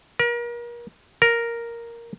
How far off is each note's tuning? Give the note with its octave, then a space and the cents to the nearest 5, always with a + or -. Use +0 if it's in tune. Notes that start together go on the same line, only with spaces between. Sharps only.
A#4 +35
A#4 +0